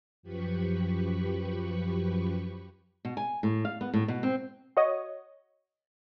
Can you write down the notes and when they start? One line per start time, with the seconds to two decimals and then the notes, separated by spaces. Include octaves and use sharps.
0.23 F#2 F3 G4 B4 B5 C#6
3.05 B2
3.17 G#5
3.43 A2
3.65 F5
3.81 B3
3.94 A2
4.08 B2
4.23 C4
4.77 F#4 C#5 D#5